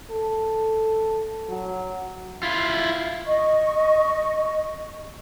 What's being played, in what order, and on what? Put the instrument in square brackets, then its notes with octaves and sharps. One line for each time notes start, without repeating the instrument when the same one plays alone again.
[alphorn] A4
F#3
[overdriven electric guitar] E4 F4
[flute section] D#5 C#6